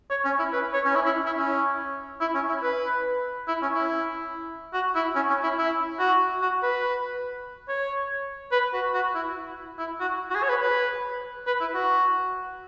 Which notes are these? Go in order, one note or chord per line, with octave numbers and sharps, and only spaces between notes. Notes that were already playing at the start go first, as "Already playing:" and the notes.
C#5
C#4
E4
B4
C#5
C#4
E4
E4
E4
C#4
E4
C#4
E4
B4
E4
C#4
E4
F#4
E4
C#4
C#4
E4
E4
F#4
F#4
B4
C#5
B4
F#4
F#4
E4
E4
F#4
F#4
G#4
C#5
B4
B4
B4
E4
F#4